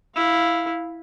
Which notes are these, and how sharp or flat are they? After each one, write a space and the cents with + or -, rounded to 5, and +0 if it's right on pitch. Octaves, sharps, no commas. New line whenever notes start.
E4 +0 F5 +0